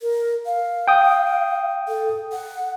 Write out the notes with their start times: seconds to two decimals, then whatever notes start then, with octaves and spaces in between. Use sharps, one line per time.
0.01 A#4
0.46 F5
0.88 G5 D#6
1.88 A4
2.32 F#5